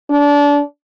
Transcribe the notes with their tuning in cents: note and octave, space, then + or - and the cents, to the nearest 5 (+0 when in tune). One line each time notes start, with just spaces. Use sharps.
D4 -25